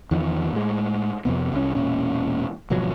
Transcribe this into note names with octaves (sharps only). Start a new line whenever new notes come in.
E2 D#3 F3
A2 G#3
F2 A2 C3 B3
C2 C#4
E1 A#2 C#4
G#1 B2 F3 F#3